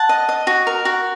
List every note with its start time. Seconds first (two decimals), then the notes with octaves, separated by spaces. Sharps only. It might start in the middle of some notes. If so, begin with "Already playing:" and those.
Already playing: F#5 A5
0.09 D#5
0.29 D#5
0.47 F#4
0.67 A#4
0.85 F#4